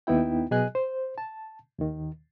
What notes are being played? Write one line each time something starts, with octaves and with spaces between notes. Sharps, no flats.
D#2 B3 D#4 E4 G5
B2 F#3 G#4 D#5 G#5 F#6
C5
A5
D#2 D#3